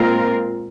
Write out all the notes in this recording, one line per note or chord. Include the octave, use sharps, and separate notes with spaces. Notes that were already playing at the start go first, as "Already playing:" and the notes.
Already playing: A#2 G#3 C4 F4 A#4